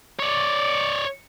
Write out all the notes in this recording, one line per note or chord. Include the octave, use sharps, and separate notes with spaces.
C#5 D5